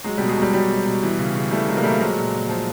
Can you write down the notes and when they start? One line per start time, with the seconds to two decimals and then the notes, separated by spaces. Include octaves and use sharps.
0.04 F#3 G#3
0.18 B2 G3
0.29 F#3 G#3
0.37 B2
0.42 G3
0.53 F#3 G3
0.70 F#3
0.87 B2
1.03 E3
1.19 C#3
1.35 C#3
1.51 E3 G3 A3
1.68 E3 F#3 G#3
1.77 A#3
1.83 C#3 G3 A3
2.00 F3 F#3 G#3
2.17 A#2
2.33 A#2
2.49 F3